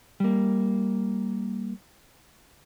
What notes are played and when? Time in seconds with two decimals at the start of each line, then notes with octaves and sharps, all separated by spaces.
0.20 G3 A#3